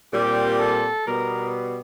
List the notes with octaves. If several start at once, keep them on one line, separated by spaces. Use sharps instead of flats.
A#2 G3 C4 G4
A4
B2 G3 B3 A#4